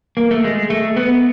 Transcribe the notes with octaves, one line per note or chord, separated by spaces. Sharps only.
A#3
A3
G#3
A3
B3